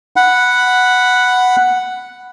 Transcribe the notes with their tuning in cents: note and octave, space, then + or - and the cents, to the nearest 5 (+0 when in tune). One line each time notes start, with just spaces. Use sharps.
F#5 +0 B5 +0